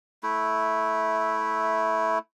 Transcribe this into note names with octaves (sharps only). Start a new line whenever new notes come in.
A3 E4